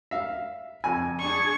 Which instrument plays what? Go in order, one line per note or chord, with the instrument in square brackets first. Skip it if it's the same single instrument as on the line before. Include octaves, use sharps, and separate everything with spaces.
[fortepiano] E5 F5
F2 G#5
[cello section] D4 G#4 [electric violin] C#6